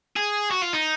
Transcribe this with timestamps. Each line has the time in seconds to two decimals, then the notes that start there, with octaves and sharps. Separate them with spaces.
0.16 G#4
0.51 F#4
0.62 F4
0.73 D#4